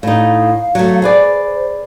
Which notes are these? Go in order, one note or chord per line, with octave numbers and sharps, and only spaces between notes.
A2 D#4 F5
F#3 A3
G#4 B4 C5 D5